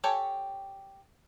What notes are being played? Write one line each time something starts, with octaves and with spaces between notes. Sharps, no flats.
G4 A4 C#5 G5 G#5